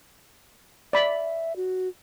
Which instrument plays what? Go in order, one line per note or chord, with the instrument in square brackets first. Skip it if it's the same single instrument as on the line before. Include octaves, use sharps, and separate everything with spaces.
[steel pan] D5 B5 [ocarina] E5
[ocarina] F#4